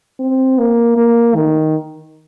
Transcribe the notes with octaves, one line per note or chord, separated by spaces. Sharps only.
C4
A#3
A#3
D#3